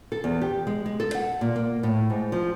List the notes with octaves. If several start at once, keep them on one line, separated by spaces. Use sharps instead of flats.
A4
E2
G4
G#3
G#3
A4
F#5
A#2
A#3
A2
G#2
F3